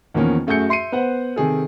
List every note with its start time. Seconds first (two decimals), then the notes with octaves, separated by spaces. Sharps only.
0.14 E2 D#3 F3 A#3 C#4
0.47 F#2 A3 F#4 G#4 G6 C#7
0.69 E5 C6 C7 C#7 D#7
0.92 B3 B4 C5 F#5
1.36 C3 D#3 G#4 A4